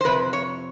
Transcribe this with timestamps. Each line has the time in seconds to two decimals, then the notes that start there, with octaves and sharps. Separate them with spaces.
0.01 C5
0.05 F2 C3 B4
0.33 C#5